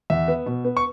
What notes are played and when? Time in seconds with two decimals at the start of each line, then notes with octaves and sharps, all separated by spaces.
0.10 E2 E5
0.28 B3
0.46 B2
0.65 B3
0.77 C#6